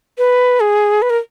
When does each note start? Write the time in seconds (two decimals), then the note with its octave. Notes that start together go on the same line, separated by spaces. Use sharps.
0.18 B4
0.60 G#4
1.02 B4
1.10 A#4